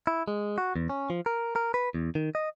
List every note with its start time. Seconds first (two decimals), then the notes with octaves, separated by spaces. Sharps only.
0.07 E4
0.28 G#3
0.58 F#4
0.76 E2
0.89 C#4
1.10 F3
1.26 A#4
1.56 A#4
1.74 B4
1.94 E2
2.15 D#3
2.35 D#5